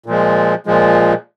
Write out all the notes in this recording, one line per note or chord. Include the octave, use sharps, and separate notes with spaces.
A#2 F3 G#3
A#2 F3 G#3